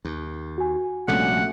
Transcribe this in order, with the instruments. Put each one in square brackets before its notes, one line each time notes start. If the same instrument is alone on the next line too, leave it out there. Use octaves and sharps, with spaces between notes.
[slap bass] D#2
[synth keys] F#4 G#5
[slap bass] A#1 C3 G3 [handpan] A3 C#4 [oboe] F#5